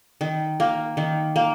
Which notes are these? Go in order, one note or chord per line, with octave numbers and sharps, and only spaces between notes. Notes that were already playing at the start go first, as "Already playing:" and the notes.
D#3
A#3
D#3
A#3